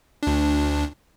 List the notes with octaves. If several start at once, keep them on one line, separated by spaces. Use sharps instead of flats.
D2 D4